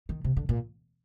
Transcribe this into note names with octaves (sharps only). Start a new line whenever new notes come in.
D#3
C3
D3
A#2